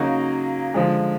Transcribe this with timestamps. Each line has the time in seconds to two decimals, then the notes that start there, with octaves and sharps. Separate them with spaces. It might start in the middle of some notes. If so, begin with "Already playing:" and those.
Already playing: C#3 F#3 A#3 D#4 F#4
0.74 D3 F3 G#3